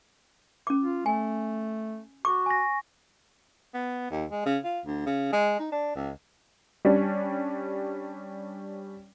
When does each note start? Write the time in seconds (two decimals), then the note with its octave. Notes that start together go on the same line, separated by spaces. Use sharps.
0.67 C#4 D6
0.81 F4
1.06 A3 G#5
2.25 F#4 C#6 D6
2.46 G#5 A#6
3.74 B3
4.11 D#2
4.31 G#3
4.46 C#3
4.64 F4
4.86 D2
5.06 C#3
5.33 G#3
5.60 D#4
5.72 D4
5.96 C#2
6.85 G3 C#4 D4